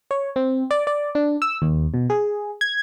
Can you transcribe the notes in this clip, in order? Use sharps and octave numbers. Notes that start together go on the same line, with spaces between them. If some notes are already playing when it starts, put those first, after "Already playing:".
C#5
C4
D5
D5
D4
E6
D#2
B2
G#4
G#6